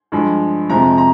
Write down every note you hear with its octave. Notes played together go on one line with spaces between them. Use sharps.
G2 F3 G#3
F2 C3 F3 G#3 A#5
A#5